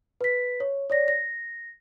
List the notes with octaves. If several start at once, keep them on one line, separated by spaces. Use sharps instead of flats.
B4 B6
C#5
C#5 D5 A#6
A#6